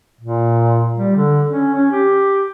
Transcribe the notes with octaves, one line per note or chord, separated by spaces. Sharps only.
A#2
G3
D3
C#4
C#4
G4